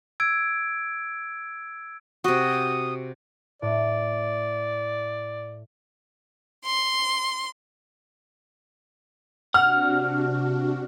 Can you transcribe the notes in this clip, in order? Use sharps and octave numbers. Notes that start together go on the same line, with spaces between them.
E6 G#6 D7
C3 F#4 D#6
A2 D5
C6
C3 D4 F#4 F#5 F6